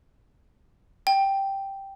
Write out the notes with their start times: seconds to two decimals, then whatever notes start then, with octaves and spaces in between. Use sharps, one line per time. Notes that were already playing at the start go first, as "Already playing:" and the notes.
1.07 G5